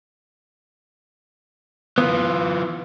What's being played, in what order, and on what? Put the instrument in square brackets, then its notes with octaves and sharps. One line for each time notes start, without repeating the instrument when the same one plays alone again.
[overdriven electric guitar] E3 F4 [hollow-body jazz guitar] B3